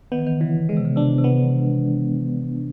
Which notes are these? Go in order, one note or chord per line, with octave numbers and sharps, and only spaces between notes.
D#3 B3
E3
D#3
C#3 E3
C#3 G#3
C3
C#3
C3 D4
C3
B3